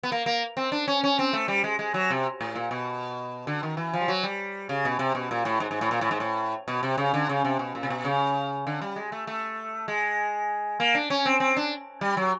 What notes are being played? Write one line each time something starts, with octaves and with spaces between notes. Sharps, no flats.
B3
A#3
A#3
C4
D4
C#4
C#4
C4
A3
G3
G#3
G#3
F#3
C3
A2
A#2
B2
D3
D#3
E3
F3
G3
F#3
G3
C#3
B2
C3
B2
A#2
A2
G#2
G#2
A2
A#2
A2
G#2
A2
B2
C3
C#3
D3
C#3
C3
B2
A#2
C3
B2
C#3
D3
G3
G#3
A3
A3
G#3
A#3
D4
C#4
C4
C4
D4
G3
F#3